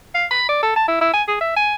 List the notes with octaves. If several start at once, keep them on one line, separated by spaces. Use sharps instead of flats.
F5
B5
D5
A4
A5
E4
E4
G#5
G#4
E5
G#5